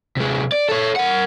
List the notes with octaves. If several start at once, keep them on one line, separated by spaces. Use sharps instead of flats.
C3 G#3
D5
A4 C#5
A#4 F#5